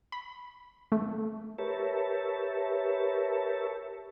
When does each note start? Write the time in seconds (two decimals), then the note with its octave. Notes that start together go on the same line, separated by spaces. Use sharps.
0.12 B5
0.92 A3
1.58 G4 A#4 B4 C#5 E5 A5